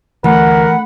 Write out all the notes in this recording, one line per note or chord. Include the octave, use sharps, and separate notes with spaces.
D2 E3 A#4 F#5 B5